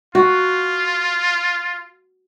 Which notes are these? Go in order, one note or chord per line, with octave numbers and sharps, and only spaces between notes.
F4 F#4